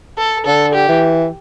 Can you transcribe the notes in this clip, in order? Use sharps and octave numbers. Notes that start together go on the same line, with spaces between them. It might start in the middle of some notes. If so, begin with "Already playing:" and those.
A4
D3 A4
G4
E3